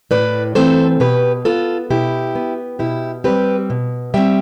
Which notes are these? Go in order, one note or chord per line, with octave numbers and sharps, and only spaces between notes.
A2 B4 D5
E3 A3 C4 A4 C5
B2 G4 B4
B3 F4 A4
B2 E4 G4
B3
B2 E4 G4
G3 C4 G4 B4
B2
G3 C4 E5 G5